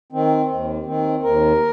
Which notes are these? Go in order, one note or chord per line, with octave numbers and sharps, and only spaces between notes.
D#3 C4
D#2
D#3 C4
D#2 A#4